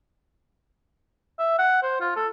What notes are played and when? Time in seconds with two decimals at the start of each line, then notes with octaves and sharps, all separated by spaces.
1.39 E5
1.58 F#5
1.82 C5
2.01 F4
2.16 A4